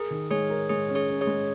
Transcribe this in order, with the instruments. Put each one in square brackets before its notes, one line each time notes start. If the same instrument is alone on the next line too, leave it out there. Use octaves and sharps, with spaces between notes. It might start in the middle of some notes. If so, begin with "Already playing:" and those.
Already playing: [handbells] G#4 [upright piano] A#4
[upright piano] D#3
[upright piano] G#3 [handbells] G#4 C#5
[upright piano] A#4
[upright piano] G#3 [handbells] G#4 C#5
[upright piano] C#4
[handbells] G#4 C#5
[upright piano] C#4
[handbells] G#4 C#5
[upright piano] G#3